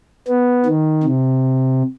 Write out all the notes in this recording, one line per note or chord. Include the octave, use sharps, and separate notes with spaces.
B3
D#3
C3